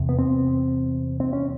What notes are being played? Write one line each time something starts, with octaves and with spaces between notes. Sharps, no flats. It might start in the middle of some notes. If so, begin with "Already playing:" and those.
Already playing: E2 C3
B3
C4
C4
C#4